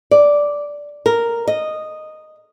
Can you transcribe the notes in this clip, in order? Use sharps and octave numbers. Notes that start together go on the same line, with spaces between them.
D5
A#4
D#5